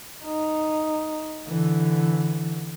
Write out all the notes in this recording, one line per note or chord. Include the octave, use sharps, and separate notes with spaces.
D#4
D3 E3